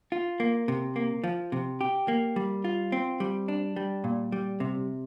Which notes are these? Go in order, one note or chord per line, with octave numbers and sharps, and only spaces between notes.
F4
A#3
C3
A#3
F3
C3
G4
A#3
G3
F4
C4
G3
D4
G3
A#2
G3
C3